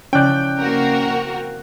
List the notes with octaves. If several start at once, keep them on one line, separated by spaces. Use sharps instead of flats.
C#3 F3 C#4 E4 D5 G5 F#6 G6
A#3 C4 F#4 A#4